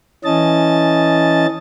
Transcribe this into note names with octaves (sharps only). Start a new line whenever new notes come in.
E3 C#4 D#5 A5 A6